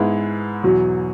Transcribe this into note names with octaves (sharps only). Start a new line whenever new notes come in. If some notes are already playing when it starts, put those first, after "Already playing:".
Already playing: G#2 G#3 B3 E4
E2 B2 F#3